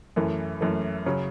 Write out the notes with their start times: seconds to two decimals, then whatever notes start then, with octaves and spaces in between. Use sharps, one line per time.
0.16 F#2 E3 A3
0.61 F#2 E3 A3
1.06 C#3 F#3 C#4